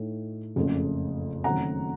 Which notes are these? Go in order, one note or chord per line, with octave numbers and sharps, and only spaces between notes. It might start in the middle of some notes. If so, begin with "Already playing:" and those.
Already playing: A2 A3 D#4
F#1 F2 C#3 A3
F#1 F#2 D#3 A3 C4 F#5 A#5